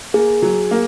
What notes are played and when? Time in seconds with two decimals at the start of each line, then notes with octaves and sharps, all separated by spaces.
0.14 A#3 G#4
0.42 F#3
0.71 A#3